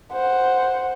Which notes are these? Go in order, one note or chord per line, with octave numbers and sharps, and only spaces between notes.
C5 F#5